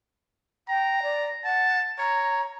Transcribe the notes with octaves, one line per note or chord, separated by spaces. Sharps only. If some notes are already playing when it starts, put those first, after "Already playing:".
G5 A#5
D5
F#5 A5
C#5 A#5